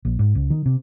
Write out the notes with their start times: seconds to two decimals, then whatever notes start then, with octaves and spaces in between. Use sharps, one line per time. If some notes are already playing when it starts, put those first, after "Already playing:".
0.05 A#1
0.19 G#2
0.35 C#2
0.50 D#3
0.66 C3